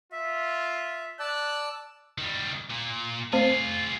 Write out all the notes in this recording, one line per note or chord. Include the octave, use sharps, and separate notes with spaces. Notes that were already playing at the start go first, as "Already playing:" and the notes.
F4 E5
D5 A5 E6 F#6
D#3 G3
A#2
A3 C4 F4 G#4 C5